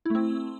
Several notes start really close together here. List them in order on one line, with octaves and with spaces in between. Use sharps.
E4 A3 C4